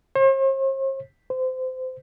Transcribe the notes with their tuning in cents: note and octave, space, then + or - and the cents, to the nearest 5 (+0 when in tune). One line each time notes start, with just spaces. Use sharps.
C5 +45
C5 -25